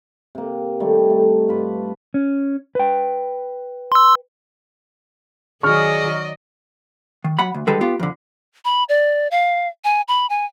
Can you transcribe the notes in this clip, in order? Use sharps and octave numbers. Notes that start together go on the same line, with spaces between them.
C3 A#3
D#3 G3 A3 D#4
A3
G2 F4 B4 D6
C#4
B4 G5
C6 E6
D#3 F#3 G#4 D5 D#5 C#6 F6
D#3
F#3 F#5 B5
D2
D3 D#3 G3 G#3 A4 B4
B3 F4 G4
F2 D3
B5
D5
F5
G#5
B5
G#5